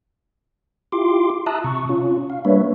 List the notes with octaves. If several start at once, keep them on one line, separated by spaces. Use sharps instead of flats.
E4 F4 G4 C6 D6
E5 A5 A#5 D#6 E6 F#6
C3 C#6
C#4 F4
F5
G3 A#3 D4 B4 C#5 E5